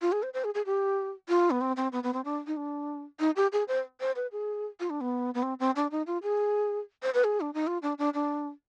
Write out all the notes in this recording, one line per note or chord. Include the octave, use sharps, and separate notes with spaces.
F4
G#4
C5
C5
G#4
G#4
G4
F4
B3
C4
C4
B3
B3
C4
D4
D#4
D4
D#4
G4
G#4
C5
C5
B4
G#4
F4
D4
B3
B3
C4
C4
D4
D#4
F4
G#4
C5
B4
G#4
D4
D#4
F4
D4
D4
D4